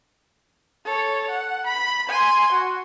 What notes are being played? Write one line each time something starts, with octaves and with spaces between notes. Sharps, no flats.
A4 C#5
F#5
B5
G#5 C6
F#4